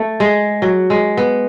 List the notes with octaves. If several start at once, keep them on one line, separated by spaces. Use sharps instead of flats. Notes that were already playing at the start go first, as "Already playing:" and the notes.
Already playing: A3
G#3
F#3
G#3
B3